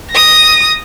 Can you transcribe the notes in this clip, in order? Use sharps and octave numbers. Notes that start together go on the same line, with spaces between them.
D#6 A#6